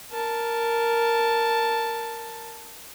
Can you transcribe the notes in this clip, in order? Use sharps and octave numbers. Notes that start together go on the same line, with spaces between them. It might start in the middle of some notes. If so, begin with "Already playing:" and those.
A#4 A5